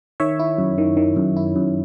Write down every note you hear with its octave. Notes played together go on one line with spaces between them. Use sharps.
D#3 C#5 E5
E4
F#2
D#3
D#3
F#2
E4
F#2